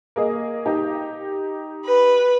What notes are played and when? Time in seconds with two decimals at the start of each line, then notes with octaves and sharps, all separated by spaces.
0.16 A#3 G#4 D#5
0.66 D#4 G4
1.85 B4